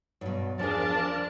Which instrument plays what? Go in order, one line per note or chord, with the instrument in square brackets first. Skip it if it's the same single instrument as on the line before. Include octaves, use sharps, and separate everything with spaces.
[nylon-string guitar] G2 B2 [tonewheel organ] F#3
[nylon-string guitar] E2 G#4 [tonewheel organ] F3 A#4 [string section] D4 [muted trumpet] A5